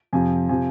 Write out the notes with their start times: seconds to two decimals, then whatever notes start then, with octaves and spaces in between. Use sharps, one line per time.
0.13 F2 C3 F3 G#5
0.49 C3 F3 G#5